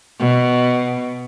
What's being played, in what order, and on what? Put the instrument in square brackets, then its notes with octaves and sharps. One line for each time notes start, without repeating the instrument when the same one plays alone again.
[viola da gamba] B2